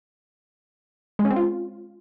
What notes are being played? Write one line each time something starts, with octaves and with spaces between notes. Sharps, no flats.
G#3
C#4
C4
F4